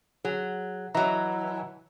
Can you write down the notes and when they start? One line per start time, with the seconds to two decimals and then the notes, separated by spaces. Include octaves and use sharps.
0.25 F#3 G#4
0.95 E3 F#3 D#5 E5 A#5